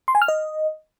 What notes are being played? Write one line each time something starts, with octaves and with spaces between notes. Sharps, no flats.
C6
G#5
F6
D#5